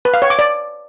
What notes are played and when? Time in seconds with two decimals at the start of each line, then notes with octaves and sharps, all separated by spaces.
0.05 B4
0.14 F5
0.22 C#5
0.30 D6
0.39 D5